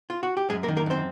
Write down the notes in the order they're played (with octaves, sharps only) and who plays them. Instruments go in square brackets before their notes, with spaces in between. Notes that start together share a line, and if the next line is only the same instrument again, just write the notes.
[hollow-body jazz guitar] F4
F#4
G4
F#2 G#3 G#4
A#3 A#4
D#3
A#3 A#4
F#2 C4 C5